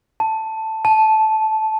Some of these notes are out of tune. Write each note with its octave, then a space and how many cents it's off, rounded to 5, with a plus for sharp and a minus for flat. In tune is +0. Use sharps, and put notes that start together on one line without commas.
A5 +5
A5 -15